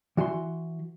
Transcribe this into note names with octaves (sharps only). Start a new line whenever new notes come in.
E3 F#4 A5 C6